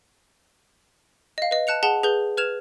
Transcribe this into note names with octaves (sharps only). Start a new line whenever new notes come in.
D#5 F5
B4 D#5
A5 F#6 C#7 F7
G#4 F#5 A5 G7
G#4 B4 G6 G7
B4 F6 G#6 E7 F7